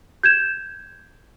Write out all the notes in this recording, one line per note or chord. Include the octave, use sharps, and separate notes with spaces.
G6 G#6 E7